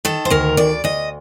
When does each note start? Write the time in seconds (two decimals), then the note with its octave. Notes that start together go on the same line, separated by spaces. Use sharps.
0.05 D#3 A4
0.25 C5
0.30 D2 A#4
0.57 D2 D5
0.84 D2 D#5